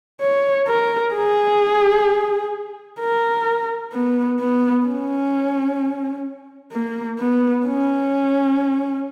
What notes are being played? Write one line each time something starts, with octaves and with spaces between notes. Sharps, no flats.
C#5
A#4
G#4
A#4
B3
B3
C#4
A#3
B3
C#4